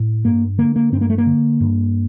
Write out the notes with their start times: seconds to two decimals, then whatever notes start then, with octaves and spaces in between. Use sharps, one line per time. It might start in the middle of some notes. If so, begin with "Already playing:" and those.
Already playing: A2
0.24 G2 A#3
0.58 D3 A#3
0.76 A#3
0.92 G2 C4
1.01 A#3
1.10 A3
1.18 A#3
1.26 D3
1.60 G2